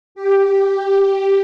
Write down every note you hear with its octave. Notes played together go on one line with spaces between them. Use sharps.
G4